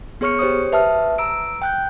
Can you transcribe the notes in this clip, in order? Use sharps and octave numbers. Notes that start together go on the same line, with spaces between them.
B3 G#4 C#5 C#6 F6 C#7
G4 C5 C#5 D#6
B4 E5 A5 D#6 F6
A#5 E6 D7
G5 F#6 G6